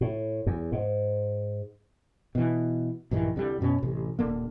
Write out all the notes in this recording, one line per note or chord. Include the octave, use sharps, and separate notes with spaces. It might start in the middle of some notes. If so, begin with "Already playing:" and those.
A2
E2
G#2
B2 E3
A#1 G2 D#3 E3
C2 D3 F#3 G3
F#2 B2 C4 C#4
A1 C3
D#1 D3 A#3